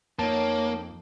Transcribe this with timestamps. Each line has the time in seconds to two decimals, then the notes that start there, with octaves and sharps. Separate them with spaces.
0.19 F2 A#3 D#4 C#5 G5 A5